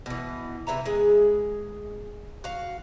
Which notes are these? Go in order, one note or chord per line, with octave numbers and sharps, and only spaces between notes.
B2 E3
C3 E3 E5 A#5
G#3 G#4
F#4 F5